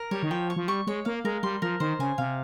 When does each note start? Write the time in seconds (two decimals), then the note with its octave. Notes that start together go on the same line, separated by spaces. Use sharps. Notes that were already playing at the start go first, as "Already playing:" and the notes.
Already playing: A#4
0.11 G3 C#5
0.23 D#3
0.31 F3 G5
0.50 C#6
0.56 F3
0.68 G3 C#6
0.87 G#3 C#5
1.05 A#3 F5
1.25 G#3 A#4
1.43 G3 C6
1.62 F3 A#4
1.80 D#3 C5
1.99 C#3 G#5
2.18 C3 F5